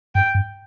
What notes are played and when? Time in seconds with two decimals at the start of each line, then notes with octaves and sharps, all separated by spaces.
0.15 G2 G5
0.35 G2